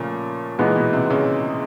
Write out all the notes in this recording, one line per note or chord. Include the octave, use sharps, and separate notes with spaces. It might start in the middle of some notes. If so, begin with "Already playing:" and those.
Already playing: A#2 C#3 F3 A3
A#2 E3 G#3 B3 D#4
B2
C3
C#3